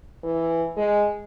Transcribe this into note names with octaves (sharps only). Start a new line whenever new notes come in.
E3
G#3